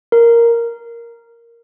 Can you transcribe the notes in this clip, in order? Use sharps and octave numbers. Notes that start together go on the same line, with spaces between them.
A#4